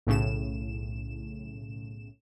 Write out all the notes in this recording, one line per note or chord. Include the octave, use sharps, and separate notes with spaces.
B1 A2 C#3 E7